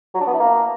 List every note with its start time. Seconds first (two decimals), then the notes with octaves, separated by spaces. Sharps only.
0.14 F#3
0.21 D4
0.27 B3
0.33 E4
0.40 A#3